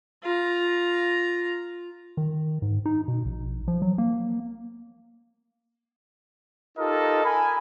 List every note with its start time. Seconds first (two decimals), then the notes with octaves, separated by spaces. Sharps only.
0.23 F4 A#5
2.17 D#3
2.62 G#2
2.86 D#4
3.08 B2
3.25 A#1
3.68 F3
3.82 F#3
3.98 A#3
6.77 D#4 F4 G4 A4 A#4 D#5
7.24 A#4 G#5 B5